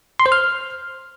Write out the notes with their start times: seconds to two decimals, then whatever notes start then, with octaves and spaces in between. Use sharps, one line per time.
0.20 C6
0.26 C5
0.32 F6